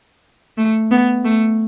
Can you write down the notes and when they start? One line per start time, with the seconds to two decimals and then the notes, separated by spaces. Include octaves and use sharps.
0.58 A3
0.91 B3
1.25 A3